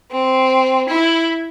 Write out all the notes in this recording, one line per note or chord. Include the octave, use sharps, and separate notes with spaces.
C4
E4